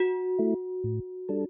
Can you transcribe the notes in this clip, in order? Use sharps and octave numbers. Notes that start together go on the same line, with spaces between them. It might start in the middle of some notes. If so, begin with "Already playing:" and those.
Already playing: F#4
A3 E4
A2
G3 D4 A4